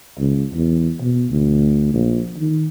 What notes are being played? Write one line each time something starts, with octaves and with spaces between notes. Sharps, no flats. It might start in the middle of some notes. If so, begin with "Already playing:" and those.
C#2
E2
B2
D2
A#1
D#3